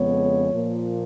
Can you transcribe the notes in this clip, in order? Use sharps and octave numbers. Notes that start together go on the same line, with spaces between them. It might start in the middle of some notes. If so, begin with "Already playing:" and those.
Already playing: F2 C#3 G#3 B3 C#5
A#2 F3 A#3